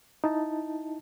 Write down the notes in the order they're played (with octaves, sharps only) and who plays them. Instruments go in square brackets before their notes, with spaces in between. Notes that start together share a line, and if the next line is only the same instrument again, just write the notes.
[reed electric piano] D#4 E4 A5